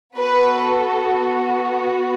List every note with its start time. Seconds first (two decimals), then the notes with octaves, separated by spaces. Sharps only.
0.16 B3 F#4 A4 B4